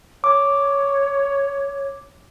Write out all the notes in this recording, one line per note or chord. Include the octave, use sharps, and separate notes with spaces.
C#5 D6